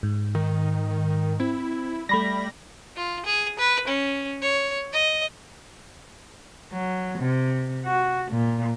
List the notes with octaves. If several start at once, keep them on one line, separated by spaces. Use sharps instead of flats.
G#2
D#3
C4 E4
G3 A3 B5 A#6
F4
G#4
B4
C#4
C#5
D#5
F#3
C3
F#4
A#2